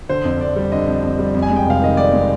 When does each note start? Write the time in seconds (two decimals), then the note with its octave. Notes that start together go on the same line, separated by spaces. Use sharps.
0.09 D3 C5
0.25 F2
0.41 F2 D5
0.56 G3
0.72 D3 D#5
0.87 F2
1.03 F2
1.19 G3
1.34 F2
1.42 G#5
1.50 G#3
1.56 G5
1.66 F1 F5
1.82 D#3 D#5
1.97 F2 D5
2.13 G#3